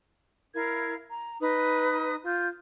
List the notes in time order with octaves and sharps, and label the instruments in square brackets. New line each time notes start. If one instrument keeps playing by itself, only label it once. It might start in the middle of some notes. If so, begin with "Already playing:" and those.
[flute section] E4 A#4 F5 G#6
A#5
D#4 B4 D#6
F4 G6